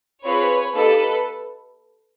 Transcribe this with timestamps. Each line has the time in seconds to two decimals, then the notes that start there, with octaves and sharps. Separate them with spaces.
0.24 C4 F4 G#4 B4 C#5
0.74 A#3 D#4 G4 A4 B4